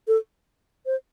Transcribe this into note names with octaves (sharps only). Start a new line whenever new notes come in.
A4
C5